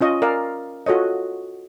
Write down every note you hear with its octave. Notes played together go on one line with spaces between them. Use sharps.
C#4 F4 D#5 C#6
A#4 D5 F5 G#5
F4 F#4 A4 C#5 D#5